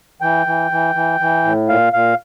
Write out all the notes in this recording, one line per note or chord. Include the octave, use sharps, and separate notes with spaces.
E3 G5
E3
E3
E3
E3
A2
A#2 F5
A#2 F5